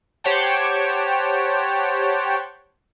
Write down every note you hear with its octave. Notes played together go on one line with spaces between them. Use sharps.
G4 C5 C#5 F#5 G5 A5